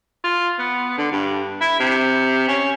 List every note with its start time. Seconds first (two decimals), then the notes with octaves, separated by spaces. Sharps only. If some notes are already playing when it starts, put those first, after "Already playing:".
0.24 F4
0.59 B3
0.98 D3
1.12 G2
1.61 E4
1.80 C3
2.48 C#4